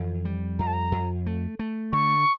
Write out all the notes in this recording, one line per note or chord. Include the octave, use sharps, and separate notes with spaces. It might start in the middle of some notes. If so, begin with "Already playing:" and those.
Already playing: F2 E3
G3
F2 A#5
A5
A#5
F2
A3
A3
D3 C#6